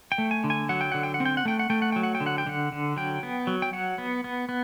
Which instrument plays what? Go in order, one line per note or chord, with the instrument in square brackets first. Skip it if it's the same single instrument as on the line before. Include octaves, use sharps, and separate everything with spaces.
[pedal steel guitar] G5
A3
G#5
D3
G#5
F#3 F#5
G5
D3 F#5
G5
F#5
C4
G5
F#5
A3 G5
F#5
A3 G5
F#5
F#3 G5
F#5
G5
D3
F#5
G5
D3 F#5
D3
F#3 G5
B3
F#3
G5
F#3 F#5
B3
B3
B3